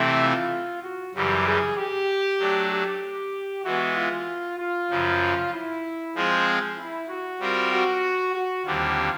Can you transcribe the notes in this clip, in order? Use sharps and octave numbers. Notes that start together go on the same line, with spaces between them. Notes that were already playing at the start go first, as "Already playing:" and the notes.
Already playing: C3 E3 A3 C4 E4
F4
F#4
F#2 C#3 E3 G3 G4
G#4
G4
F#3 A3 D4
G4
E3 G#3 B3 F#4
F4
F4
F#2 C#3 F3
E4
F3 G#3 C4 F4 G#4
E4
F#4
G3 C4 F4 A#4
F#4
F#4
D#2 D3 G3 C4 F4